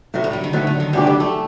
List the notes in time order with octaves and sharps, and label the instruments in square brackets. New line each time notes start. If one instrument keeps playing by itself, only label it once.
[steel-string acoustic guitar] A2 F#3 A3
[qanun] G3
D3
D#3
[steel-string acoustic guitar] A2 F#3 A3 [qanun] D3
[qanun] D3
D#3
[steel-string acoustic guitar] F#2 D3 A3 D4 G4 [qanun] G3
[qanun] G3
A3